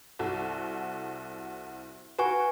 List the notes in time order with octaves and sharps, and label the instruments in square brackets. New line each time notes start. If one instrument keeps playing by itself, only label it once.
[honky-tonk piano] C2 F#4 A4
[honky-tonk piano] F#4 [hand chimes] B4 G#5 C#6